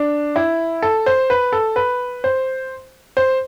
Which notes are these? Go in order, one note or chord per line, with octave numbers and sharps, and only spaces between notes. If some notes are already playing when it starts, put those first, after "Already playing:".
Already playing: D4
E4
A4
C5
B4
A4
B4
C5
C5